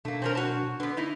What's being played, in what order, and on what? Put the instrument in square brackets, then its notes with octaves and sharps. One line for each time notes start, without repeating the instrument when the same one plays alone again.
[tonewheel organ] B2 D4 [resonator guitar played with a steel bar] A3 A#3
[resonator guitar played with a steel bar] C4 C#4 A#4
F#3 F#4 A5
[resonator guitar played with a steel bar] D3 B3 [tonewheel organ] D4 B4
[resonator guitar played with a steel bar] D#4 E4